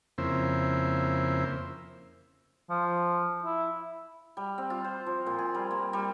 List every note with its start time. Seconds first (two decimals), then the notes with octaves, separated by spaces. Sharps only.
0.18 F2 C#3 A#3 C4 E4 C5
2.70 F3
3.44 E4
4.37 G3
4.58 C4
4.70 F4
4.84 C5
5.06 F3
5.26 A#2
5.39 G#4
5.55 G3
5.71 A#3
5.93 G3